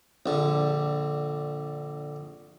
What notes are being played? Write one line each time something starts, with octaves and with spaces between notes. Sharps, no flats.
A#1 D3